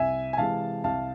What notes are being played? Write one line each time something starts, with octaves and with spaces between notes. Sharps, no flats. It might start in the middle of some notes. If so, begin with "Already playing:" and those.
Already playing: C2 E5 G#5
G#5
C3 E3 G#3 F5 A5
C2 F5 A5